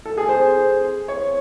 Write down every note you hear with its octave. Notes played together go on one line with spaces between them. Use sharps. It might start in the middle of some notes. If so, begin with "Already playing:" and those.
A4
G#4
C5
C#5